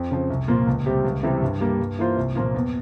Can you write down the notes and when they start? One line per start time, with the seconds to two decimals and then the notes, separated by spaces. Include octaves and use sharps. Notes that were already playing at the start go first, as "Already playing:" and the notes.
Already playing: F2
0.11 C#3 F3
0.30 C2
0.48 A#2 F3 A#3 F4
0.67 C#2
0.86 C3 G3 C4 G4
1.05 C#2
1.23 C3 E3 G3 C4
1.42 G2
1.61 G3 A#3
1.79 G2
1.99 E3 A#3 F4 C5
2.17 C2
2.35 A#2 F3 A#3 F4
2.54 E2